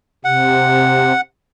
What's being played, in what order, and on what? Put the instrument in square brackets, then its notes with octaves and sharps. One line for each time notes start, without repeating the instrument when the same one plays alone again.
[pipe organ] C3 [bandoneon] F#5